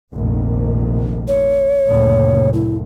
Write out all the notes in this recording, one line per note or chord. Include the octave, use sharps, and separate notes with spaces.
F1 A#1 D#3
C#5
F#1 D2 A#2
E4